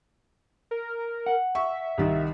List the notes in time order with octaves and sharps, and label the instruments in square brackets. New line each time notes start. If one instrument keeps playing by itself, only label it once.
[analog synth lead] A#4
[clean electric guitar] F#5
[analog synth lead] E5 [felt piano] C#6
[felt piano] C2 D#3